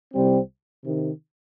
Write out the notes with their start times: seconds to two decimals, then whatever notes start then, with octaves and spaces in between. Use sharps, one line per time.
0.14 C2 C3 G3 C4
0.85 C3 D#3